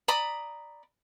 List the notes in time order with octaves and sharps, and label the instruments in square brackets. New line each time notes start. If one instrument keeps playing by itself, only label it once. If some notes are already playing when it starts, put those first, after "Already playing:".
[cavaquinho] D5 A#5 B5 D#6